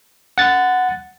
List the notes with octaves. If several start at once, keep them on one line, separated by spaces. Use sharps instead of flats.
F#5 A6